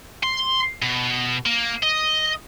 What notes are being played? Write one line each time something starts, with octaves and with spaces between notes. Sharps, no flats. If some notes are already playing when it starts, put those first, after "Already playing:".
C6
B2
A#3
D#5